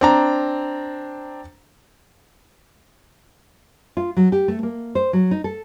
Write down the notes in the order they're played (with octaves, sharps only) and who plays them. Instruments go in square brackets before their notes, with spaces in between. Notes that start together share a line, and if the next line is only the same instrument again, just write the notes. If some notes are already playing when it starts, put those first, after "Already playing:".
[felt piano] C4 D4 A#5
[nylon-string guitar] F4
F#3
G4
A3
A#3
C5
F#3
D#4
A4